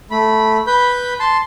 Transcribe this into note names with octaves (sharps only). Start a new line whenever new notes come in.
A3 B5
B4 B5 G6
A5 C6